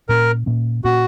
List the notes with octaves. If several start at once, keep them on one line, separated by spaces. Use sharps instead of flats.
A#2 A#3 C#4 A#4
A#2 A#3 C#4
A#2 A#3 C#4 F#4